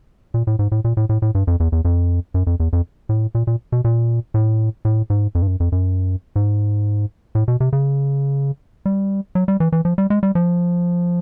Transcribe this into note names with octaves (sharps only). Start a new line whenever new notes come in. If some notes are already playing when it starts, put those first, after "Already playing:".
A#2
A2
G#2
A2
A#2
A2
A2
A2
G2
F2
E2
E2
F2
F#2
F2
E2
F2
A2
A#2
A#2
B2
A#2
A2
A2
G#2
F2
G2
F#2
F2
F#2
G#2
A2
B2
C3
C#3
G3
F#3
G3
E3
E3
F3
G3
G#3
G3
F3